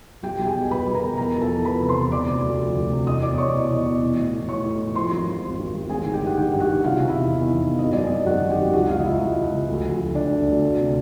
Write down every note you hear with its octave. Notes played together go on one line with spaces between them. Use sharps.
B1 G4 G5
B1 G5
G#4 G#5
B2
B1 B4 B5
B1
A#4 A#5
B2
E2 A#4 A#5
F3
A4 A5
E2
F3 B4 B5
C3
C5 C6
E2
C3 D5 D6
D2
D2
F3
D2
C3
E2 D#5 D#6
E2 D5 D6
E2 C#5 C#6
B2
E2
B2
E3
A2
E3
A2 C#5 C#6
A2
E3
F3 C5 C6
G#1
G#1
G#1
G#1
G#1
A1 G#4 G#5
D#3
G4 G5
G2
F#5
D#3 G4 G5
G2
F#4 F#5
D#3
C3 F4 F5
C3
E4 E5
E2
D#3
E2
E2
G#1 D#5
F#2 D5
F#2 D#4 D#5
F#2 F#4 F#5
D#3
G4 G5
G#1
C#2 F#4 F#5
E3 F4 F5
D#5
C#2 E4 E5
C#2
C#2
C#2
D2
F3
D2
D3 D4 D5
D2
D2
D2
C3